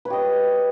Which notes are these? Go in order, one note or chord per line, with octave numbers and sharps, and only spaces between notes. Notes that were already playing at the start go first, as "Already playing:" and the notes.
G4 B4 C#5 D#5